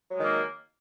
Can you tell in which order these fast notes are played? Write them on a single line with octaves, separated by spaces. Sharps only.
F#3 G#3 D#3 A#3